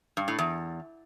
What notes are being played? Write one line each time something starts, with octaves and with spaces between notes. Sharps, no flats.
G2
A2
E2